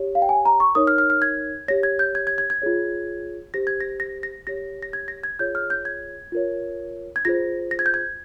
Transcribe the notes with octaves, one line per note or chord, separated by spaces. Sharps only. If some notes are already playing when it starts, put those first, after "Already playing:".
Already playing: G4 C#5
F5
G5
G#5
A#5
C#6
D#4 A#4 C#5 D#6
F6
F6
F6
G#6
G4 C#5 A#6
G#6
G6
G#6
G#6
G#6
G#6
F4 G#4 C#5
G4 C5 A#6
G#6
A#6
A#6
A#6
G4 C#5 A#6
A#6
G#6
A#6
G#6
F4 G#4 C#5 G6
F6
G6
G#6
F4 A#4 C#5
G#6
F4 G#4 C5 A#6
A#6
G#6
G6
G#6